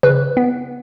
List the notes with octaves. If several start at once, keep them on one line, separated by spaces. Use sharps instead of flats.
C#3 B4
B3